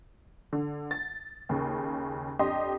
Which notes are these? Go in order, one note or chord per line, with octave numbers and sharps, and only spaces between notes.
D3
A6
D#2 C#3
F2 D4 G4 D#5 C6